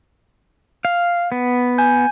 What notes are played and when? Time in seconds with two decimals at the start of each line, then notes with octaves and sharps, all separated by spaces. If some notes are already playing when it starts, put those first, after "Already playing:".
0.85 F5
1.32 B3
1.78 G#5 G6